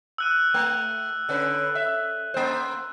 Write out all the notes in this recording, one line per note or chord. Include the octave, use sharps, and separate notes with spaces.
E6 F#6 D#7
A3
D3 C#4 B4
E5
A#3 C5